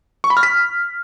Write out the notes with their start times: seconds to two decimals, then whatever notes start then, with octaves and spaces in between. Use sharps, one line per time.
0.24 C#6
0.30 B5
0.37 F6
0.43 B6